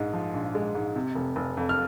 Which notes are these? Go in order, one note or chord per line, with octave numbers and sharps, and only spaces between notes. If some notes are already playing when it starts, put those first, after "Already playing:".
Already playing: A#1 G#2 G#3
F3
A#1
G#3
G#2
C3
F1
F1
F2
F6